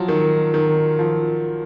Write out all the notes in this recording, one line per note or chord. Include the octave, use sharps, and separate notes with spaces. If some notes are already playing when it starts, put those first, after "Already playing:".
Already playing: F3 F#3
D#3
D#3
F3